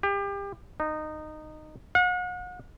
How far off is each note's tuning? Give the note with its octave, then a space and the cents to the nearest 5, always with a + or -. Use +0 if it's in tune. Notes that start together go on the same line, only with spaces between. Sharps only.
G4 +30
D#4 -15
F#5 -40